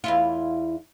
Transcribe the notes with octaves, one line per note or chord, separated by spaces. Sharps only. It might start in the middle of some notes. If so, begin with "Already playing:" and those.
E2 E4 F4